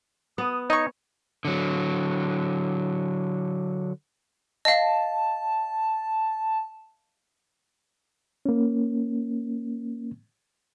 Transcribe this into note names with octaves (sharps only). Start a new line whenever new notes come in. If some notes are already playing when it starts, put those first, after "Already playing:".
B3 D#6
D#4 C#5 D#5 C#6
D3 F#3
D#5 F5 A5
A#3 C#4